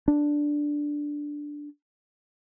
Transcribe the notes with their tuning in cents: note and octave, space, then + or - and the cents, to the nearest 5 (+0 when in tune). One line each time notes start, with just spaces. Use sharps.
D4 +0